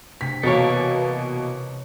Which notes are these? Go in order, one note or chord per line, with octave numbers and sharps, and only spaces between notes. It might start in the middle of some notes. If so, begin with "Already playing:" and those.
D2 C3 B6
B2 E3 A#3 A4 A#4 C#5